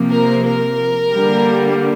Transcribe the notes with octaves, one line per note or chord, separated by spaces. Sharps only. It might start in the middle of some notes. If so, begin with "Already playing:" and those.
Already playing: C3 F3 A#3
A#4
A#4
D3 G3 A#3